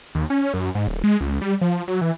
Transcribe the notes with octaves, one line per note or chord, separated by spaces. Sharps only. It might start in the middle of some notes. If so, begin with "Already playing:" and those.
D#2
C#4
F#2
G#2
D1
G#3
C#2
G3
F3
F#3
E3